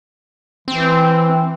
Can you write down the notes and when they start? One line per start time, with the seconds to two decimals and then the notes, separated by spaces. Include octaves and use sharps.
0.68 E3 C4